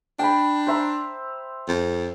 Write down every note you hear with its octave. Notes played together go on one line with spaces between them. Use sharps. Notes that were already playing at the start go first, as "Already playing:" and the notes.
D4 G5 A5 B5
C5 E5 A#5
F2